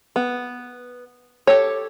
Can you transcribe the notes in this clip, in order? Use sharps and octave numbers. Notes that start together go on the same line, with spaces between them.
B3
G4 A4 C#5